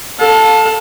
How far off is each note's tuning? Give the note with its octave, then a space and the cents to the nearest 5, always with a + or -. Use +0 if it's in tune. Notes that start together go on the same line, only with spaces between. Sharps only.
A4 +0 F5 +40